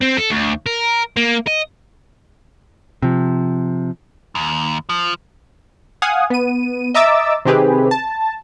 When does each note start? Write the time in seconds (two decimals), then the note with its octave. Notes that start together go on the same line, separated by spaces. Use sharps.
0.02 C4
0.18 A4
0.31 D2
0.66 A#4
1.17 A#3
1.47 D#5
3.03 C3 F3
4.35 D#2
4.89 F3
6.02 F5 F#5 G#5 D#6
6.30 B3 D#7
6.94 D#5 E5 A#5 D6 E6 A6
7.45 C3 D#3 C4 G4 G#4 B4
7.91 A5